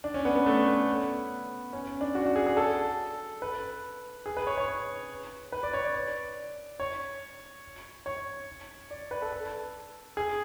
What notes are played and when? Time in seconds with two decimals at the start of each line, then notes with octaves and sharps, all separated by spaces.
0.04 D4
0.14 C#4
0.25 B3
0.36 B3
0.46 A3
0.67 B3
1.73 C#4
2.01 D4
2.15 F#4
2.26 F#4
2.36 G#4
2.47 G#4
2.57 A4
3.42 B4
4.26 G#4
4.37 B4
4.47 C#5
4.57 C#5
5.52 B4
5.63 D5
5.73 C#5
5.84 D5
6.80 C#5
8.06 C#5
8.91 D5
9.11 B4
9.22 A4
9.32 A4
10.17 G#4